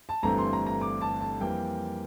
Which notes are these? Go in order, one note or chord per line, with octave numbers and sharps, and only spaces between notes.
A5
G1 G2 E3 A3 C4 A#5
C6
A#5
A#5
D6
A5
A5
F2 E3 G3 A#3 G5